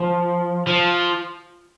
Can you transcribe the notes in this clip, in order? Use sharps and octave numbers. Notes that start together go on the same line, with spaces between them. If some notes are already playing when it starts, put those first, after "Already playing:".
Already playing: F3
F3